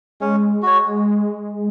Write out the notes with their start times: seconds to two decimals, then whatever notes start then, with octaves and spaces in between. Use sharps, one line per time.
0.20 G#3 C#4
0.62 F#4 C#5